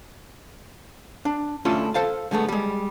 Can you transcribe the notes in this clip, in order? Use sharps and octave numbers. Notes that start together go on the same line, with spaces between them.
D4
A3 C#4 D4 E4 F4 A4
A4 C5 F5 A5
D3 G#3 A3 B3
G3 G#3